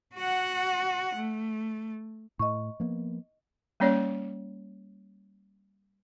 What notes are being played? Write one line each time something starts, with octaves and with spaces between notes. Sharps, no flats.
F#4 F#5
A3
A2 D#5 C#6
F3 A#3 B3
G3 A#3 C#4 C#5 D5